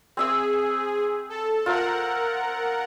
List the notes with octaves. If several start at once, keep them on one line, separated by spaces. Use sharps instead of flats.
C4 G#4 E5 E6
A4
F4 A#4 C5 E5 F#5